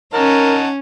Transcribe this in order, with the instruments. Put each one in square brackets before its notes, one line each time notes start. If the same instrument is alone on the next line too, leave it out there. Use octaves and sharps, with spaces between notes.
[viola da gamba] C#4 [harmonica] D#4 F#5 A5 [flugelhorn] A#4